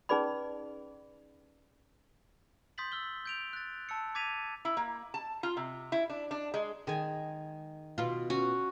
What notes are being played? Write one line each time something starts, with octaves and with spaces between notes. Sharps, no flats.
C#4 D#4 G#4 B4 D5 B5
C6 D#6 G6 A6 B6 F#7
E6 F6 G7
G6 D7 F7
F#6 A6
A5 E6 C#7
D6 G#6 A6 B6 D#7 F7
E4
A#3
A5
F4
C3
E4
D4
D4
G#3
D#3 G#3 G#5
B2 F4
C#4 F#4